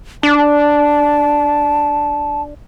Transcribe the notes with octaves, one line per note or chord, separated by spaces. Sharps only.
D4 A5